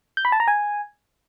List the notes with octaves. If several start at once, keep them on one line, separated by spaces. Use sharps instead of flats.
G6
B5
A5
A#5
G#5